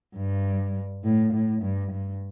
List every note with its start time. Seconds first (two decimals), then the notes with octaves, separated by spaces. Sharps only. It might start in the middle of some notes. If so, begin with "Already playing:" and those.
0.15 G2
1.04 A2
1.33 A2
1.62 G2
1.92 G2